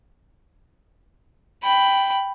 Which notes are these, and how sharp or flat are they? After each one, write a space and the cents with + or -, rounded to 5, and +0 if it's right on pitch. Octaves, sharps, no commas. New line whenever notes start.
G5 +0 B5 +5